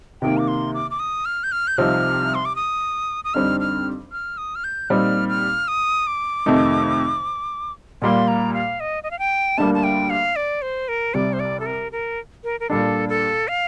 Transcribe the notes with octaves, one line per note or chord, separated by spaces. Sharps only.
C3 D#3 A#3 G5
D6
C6
D6
D6
D#6
F6
G6
F6
G6
C2 C3 F3 C4 D#4 F6
C6
D6
D#6
D#6
F2 D3 G3 C4 D#4 F6
F6
F6
D#6
F6
G6
A#2 G3 C4 D#4 F6
F6
D#6
D6
F2 C3 D#3 A3 D#4
A#2 G3 A#3 C6
A#5
F5
D#5
D#5
F5
G5
D2 D3 G3 A#3 A5
A5
G5
F5
D5
C5
A#4
C2 C3 G3 D5
C5
D5
A4
A#4
A#4
A#4
A#4
A#2 G3 D4 A4
A4
F5